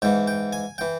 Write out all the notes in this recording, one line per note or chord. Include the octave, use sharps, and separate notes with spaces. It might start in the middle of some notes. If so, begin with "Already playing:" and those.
G#2 E3 G5
G5
G#5
E3 G5